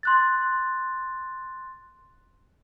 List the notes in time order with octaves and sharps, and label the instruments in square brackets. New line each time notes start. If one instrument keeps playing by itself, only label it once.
[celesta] C6 F#6 A6